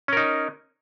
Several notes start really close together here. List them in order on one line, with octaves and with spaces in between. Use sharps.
C#4 A#4 D#4